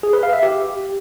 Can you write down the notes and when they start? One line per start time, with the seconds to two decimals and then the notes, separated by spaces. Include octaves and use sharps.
0.03 G#4
0.13 B4
0.23 F5
0.33 E5
0.43 G4